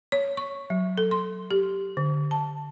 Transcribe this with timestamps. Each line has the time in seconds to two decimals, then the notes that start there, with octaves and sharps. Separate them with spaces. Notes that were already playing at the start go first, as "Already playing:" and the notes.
0.12 C#5
0.37 C#6
0.70 F#3
0.98 A4
1.11 C6
1.51 G4
1.97 D3
2.31 A5